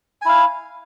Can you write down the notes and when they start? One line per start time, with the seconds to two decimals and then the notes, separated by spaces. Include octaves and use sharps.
0.22 G#5
0.25 E4
0.29 F5